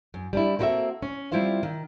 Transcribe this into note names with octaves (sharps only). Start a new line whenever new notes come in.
F#2
G3 D4 E4
A#3 C4 E4 F#4 A4 E5
C#4
G3 C4 E4 F4 C5 F5
D#3